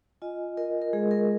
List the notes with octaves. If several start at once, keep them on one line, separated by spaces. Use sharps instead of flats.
F4 D#5 G#5
F4 A#4 D#5
A#4
G#3 G#4
A#4